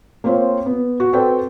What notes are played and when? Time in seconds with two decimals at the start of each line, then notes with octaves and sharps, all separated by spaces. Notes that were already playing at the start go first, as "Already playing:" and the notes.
0.24 A#3 C4 F4 C5 C#5
0.66 B3
1.00 F#4
1.13 C4 F#4 A4 B4 D5 G5